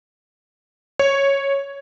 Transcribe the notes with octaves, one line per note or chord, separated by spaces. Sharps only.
C#5